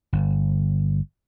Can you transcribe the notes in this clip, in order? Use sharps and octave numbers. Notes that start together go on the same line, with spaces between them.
G1